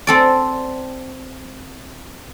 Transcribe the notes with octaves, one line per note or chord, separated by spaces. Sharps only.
C4 A4 D5